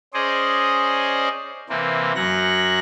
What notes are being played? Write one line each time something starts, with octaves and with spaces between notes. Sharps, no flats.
C#4 G#4 C5 D5 D#5
C3 E3 A#3 C4
F#2 F#3 C#5 F#6 A#6